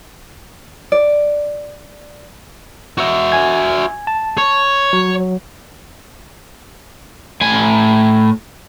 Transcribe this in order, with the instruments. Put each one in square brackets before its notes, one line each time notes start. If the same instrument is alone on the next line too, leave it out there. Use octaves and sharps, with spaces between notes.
[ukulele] D5
[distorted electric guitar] F#4 E5
[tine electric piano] G#5 G#6
A5
[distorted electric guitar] C#5
[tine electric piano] F#3
[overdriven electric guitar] A2 G#5